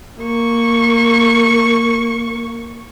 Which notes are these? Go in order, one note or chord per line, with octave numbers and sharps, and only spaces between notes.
A#3 C#6